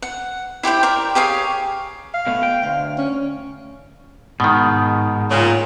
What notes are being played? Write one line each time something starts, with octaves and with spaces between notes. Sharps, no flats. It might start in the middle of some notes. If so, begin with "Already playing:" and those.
F#5
E4 G4 C5 G5
A#4 D5
G4 G#4 C#5 F5
F5
B2 A3
G5
D2 F5
C#4
G#2 B2 D#3
A#2 C#3